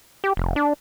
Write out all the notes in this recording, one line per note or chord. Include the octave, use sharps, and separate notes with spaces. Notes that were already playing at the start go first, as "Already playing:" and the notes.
G4
F1
D4